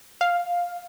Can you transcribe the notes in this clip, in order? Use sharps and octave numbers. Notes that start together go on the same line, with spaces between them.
F5